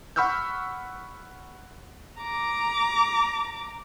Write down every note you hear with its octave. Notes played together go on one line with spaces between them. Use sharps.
F#5 B5 C#6 E6 F6 G6
A#5 D6